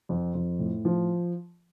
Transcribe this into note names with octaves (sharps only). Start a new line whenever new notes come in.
F2
F2
A2
F3